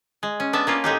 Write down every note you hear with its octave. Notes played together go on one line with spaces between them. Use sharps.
G#3
C#4
B3 D4 E5 A5
A#3 C#4 F4
A2 G#3 D#4 G4